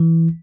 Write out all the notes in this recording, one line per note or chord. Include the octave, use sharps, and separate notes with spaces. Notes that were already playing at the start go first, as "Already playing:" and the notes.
Already playing: E3